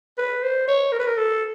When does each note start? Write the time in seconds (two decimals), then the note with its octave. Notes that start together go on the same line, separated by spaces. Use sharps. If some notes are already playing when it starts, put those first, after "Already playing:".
0.18 B4
0.42 C5
0.68 C#5
0.92 A#4
0.99 B4
1.07 A#4
1.17 A4